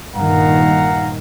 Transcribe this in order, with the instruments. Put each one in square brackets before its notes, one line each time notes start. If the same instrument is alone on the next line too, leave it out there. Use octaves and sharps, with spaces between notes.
[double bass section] G2 A#2 D#3 [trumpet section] F5 F#5 A#5